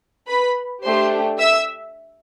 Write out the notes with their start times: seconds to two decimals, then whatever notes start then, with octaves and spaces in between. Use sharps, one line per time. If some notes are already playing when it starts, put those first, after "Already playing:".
0.28 B4 B5
0.83 A3 D4 G4 C5 C6
1.38 E5 E6